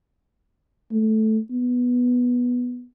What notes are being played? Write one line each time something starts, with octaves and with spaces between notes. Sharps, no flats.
A3
B3